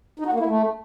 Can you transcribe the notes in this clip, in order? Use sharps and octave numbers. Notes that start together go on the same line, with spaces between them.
D#4
F#4
A#3
E4
A3